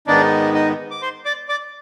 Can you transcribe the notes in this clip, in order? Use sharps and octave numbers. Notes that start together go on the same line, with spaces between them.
G#2 D#3 B3 D4 D#4 D5
D#4 D#5
D6
C5 C6
D5 D6
D5 D6